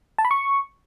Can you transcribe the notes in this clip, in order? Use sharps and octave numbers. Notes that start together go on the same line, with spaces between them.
A5
B5
C#6